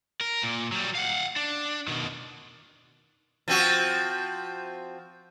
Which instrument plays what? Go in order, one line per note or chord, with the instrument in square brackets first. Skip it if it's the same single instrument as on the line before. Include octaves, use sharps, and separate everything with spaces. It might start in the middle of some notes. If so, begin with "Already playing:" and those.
[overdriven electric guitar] A#4
A#2
F#3 G3
F5 F#5
D4
B2 D#3
[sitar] F3 C4 F#4